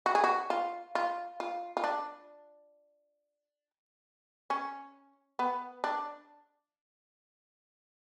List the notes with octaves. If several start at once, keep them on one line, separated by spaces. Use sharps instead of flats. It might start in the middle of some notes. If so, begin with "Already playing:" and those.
F#4
G#4
F#4
F4
F4
F4
F4
D4
C#4
B3
D4